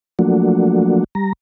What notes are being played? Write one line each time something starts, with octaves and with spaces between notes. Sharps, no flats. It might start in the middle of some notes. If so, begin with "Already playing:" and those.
F3 F#3 A3 A#3 D4 F#4
G3 A#5